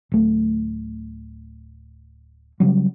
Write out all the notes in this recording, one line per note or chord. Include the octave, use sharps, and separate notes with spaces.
D1 A3
C#3 F#3 G3